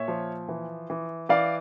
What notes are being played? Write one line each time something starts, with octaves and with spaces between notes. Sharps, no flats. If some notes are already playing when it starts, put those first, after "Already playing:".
Already playing: A#2 C#5 E5
F3
E3
E3
E3 D5 F5